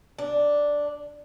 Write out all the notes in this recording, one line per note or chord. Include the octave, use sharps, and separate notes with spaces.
D4